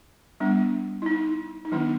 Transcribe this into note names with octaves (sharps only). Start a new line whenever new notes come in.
G3 B3 D4
E4
D#4
D#4
D#3 F#3 B3 D4 E4